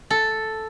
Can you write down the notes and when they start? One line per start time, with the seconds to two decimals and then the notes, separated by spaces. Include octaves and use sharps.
0.10 A4